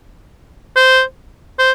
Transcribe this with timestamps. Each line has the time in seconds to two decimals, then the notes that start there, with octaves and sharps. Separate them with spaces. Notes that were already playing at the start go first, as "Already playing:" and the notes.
0.76 C5
1.59 C5